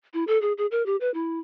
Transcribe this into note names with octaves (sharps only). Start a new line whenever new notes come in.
E4
A4
G#4
G#4
A#4
G4
B4
E4